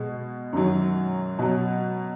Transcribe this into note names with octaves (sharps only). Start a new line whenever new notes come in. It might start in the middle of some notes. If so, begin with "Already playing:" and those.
Already playing: B2 G#3
F#2 D#3 F#3
B2 F#3